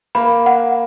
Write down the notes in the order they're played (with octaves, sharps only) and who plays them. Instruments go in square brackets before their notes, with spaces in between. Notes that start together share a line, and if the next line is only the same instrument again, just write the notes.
[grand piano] A#3 [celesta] B5
[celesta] F#5